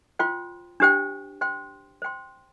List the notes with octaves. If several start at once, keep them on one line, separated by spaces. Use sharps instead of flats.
F4 C5 G5 C6
D4 G4 C5 G5
C5 G5 C6
C5 G5 C6